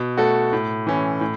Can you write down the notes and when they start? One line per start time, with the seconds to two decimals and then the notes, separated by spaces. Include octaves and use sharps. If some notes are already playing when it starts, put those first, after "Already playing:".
Already playing: B2
0.17 A3 F#4 A4
0.53 A2
0.87 E3 C#4
1.21 A2